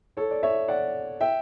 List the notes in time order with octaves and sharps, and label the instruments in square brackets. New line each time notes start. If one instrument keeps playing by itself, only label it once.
[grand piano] A4 C#5
D5
C#5 E5
D5 F#5
E5 G5